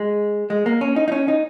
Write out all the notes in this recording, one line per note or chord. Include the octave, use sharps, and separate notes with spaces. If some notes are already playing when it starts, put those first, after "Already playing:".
Already playing: G#3
G#3
A#3
C#4
D#4
D#4
C#4
D#4